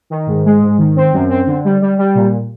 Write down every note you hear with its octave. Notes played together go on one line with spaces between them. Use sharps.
D#3
G#2
G#3
G#2
D#3
C4
F#2
C4
D3
G3
G3
G3
A#2